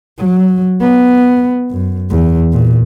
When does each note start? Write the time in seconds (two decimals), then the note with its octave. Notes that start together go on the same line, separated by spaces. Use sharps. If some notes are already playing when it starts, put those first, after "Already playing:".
0.18 F#3
0.81 B3
1.71 F#2
2.11 E2
2.53 A#2